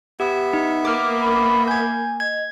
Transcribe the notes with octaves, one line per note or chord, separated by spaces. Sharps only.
B3 G4 E5
D#4
A#3 D6 F6
B5
G#5 G6 G#6
D#5 G#6